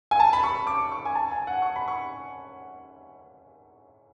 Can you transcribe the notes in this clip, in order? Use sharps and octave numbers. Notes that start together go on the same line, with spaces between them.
G#5
A5
B5
C#6
D6
C#6
G#5
A5
G#5
F#5
C#6
B5
C#6